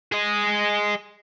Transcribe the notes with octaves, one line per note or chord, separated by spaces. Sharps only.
G#4 D#5